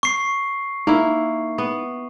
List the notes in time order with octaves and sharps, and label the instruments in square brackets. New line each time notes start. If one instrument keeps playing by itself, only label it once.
[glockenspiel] C#6 C7
[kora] A#3 E4 [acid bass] D#4
[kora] B3